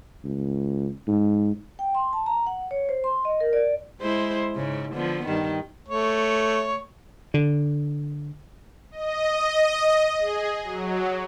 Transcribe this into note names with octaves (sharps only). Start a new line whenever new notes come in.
C#2
G#2
G5
C6
A5
A#5
F#5
C#5
C5
C6
D#5
A#4
D5
G#3 E4 C5
G#2 C#3
D3 F3 B3
G2 D#3
A3 C#5
D3
D#5
G#4
F#3